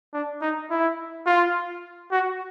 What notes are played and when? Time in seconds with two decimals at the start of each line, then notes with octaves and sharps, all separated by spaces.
0.13 D4
0.41 D#4
0.70 E4
1.26 F4
2.11 F#4